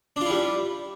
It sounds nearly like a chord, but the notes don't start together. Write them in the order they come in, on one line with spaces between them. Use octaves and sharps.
D4 F4 E4 G3